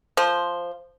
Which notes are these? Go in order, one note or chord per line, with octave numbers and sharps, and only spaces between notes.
F3 C5